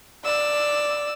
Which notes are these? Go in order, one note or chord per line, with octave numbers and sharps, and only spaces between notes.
D5 E6